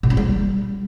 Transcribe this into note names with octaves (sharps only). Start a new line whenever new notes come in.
A#2
C4
G3